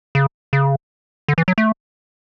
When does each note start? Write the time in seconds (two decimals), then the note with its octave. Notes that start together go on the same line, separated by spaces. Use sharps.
0.15 C#3
0.53 C#3
1.28 D3
1.38 E3
1.48 F#3
1.58 A3